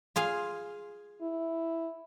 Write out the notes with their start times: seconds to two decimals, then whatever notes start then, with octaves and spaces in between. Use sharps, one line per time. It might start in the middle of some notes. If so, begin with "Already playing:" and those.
0.16 F4 G#4 F5
1.22 E4